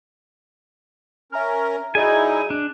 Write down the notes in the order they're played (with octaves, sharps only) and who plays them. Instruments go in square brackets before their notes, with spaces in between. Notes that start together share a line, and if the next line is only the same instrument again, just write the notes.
[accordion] C#4 A#4 [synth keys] E5 A#5 F6
[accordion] F#3 D#4 E4 [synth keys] G#4 D5 D#5 [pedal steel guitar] G#5
[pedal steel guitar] D4